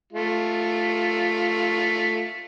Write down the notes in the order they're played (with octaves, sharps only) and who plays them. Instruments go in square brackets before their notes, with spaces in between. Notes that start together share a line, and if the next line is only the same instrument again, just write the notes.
[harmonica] A3 F4